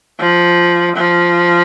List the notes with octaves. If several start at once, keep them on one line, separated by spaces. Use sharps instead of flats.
F3
F3